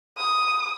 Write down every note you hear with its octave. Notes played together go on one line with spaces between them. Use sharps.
D#6